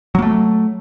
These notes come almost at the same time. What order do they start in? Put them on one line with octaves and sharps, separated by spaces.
F#3 A#3 A3